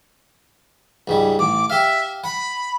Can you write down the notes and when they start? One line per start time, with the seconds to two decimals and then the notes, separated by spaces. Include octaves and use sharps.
1.08 C#2 G#2 G3
1.39 A1 D6
1.70 G4 E5 F5
2.24 F#5 B5